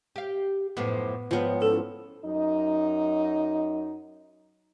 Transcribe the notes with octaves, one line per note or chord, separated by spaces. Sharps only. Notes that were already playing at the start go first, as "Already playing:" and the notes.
G4 F5
F#2 A2 F3 B3 D6
G#2 F3 B3 F4 C#5 G5
C#4 E4 F4 A4
F#2 F#3 D#4